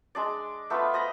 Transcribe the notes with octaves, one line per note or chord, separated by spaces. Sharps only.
G#3 D4 D5
A3 B3 F4 B4
C5 D#5 A#5 B5